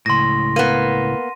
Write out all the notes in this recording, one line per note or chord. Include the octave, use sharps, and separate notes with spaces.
C#2 A2 C6 A#6
A#3 B3 D#7